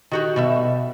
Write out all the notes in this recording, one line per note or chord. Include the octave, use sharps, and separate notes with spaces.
D#3 F#4 G4
B2 G3 E5